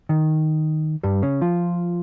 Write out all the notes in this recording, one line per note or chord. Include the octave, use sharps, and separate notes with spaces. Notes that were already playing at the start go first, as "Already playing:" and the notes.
D#3
G2 G3
C#3 C#4
F3 F4